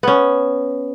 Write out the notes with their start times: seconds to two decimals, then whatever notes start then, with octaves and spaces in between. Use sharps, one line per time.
0.03 B3 C#4